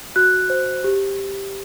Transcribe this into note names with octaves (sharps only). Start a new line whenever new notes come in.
F#4 F#6
C5
G4